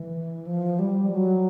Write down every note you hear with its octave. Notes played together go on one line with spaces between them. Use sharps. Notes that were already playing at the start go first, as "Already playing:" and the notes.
Already playing: E3
F3
G3
F#3